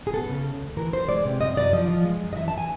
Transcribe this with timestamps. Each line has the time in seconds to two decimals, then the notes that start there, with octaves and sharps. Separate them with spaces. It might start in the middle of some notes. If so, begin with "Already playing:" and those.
0.07 G#4
0.13 B3 A4
0.30 C#3
0.46 D2
0.61 D2
0.77 E3 A#4
0.93 E3 C5
1.09 G#3 D5
1.25 C3
1.41 F#2 D#5
1.57 F#2 D5
1.73 F3 D#5
1.88 F3
2.04 G#3
2.21 F#2
2.33 D#5
2.37 E3 E5
2.48 E3 A5
2.58 G#5